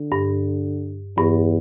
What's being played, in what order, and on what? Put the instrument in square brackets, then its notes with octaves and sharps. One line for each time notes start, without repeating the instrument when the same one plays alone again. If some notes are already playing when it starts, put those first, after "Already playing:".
Already playing: [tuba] D3
[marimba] G2
[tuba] E2 [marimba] G2